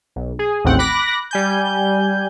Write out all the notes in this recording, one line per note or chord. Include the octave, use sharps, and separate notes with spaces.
B1
G#4
A1 D#2 A2 C4 F#5 G5
B5 D6 F#6 A#6
G3 G#5 G6